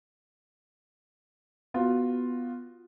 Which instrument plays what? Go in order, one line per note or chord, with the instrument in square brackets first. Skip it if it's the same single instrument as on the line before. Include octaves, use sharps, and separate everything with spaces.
[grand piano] B3 F4 F#4